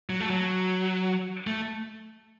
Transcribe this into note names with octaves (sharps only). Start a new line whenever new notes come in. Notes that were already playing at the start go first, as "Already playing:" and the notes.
F#3
A3
F#3
A3